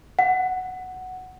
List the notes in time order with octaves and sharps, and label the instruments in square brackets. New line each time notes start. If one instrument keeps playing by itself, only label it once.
[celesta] F#5